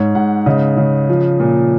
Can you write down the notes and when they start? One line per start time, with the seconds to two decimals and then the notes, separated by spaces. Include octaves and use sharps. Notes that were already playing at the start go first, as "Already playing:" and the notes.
Already playing: G#2 C#5
0.15 G#2 F#5
0.46 C#3 D#5
0.77 C#3
1.09 F3
1.40 A#2